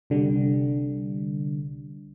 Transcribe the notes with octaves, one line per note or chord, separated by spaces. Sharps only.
C2 D3 G3